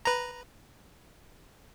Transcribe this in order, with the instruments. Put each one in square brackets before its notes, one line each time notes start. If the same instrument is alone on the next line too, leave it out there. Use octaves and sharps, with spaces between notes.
[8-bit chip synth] B4 A#5